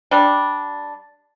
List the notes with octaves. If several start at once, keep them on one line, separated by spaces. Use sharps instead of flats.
G3 D4